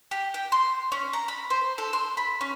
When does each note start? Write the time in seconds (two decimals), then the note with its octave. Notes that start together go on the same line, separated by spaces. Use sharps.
0.11 G4
0.34 G5
0.52 C6
0.92 C#4
1.13 A#5
1.28 B5
1.50 C5
1.78 A4
1.93 C6
2.17 B5
2.41 C#4